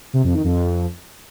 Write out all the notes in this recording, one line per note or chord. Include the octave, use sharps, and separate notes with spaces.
C3
F2
D#3
F2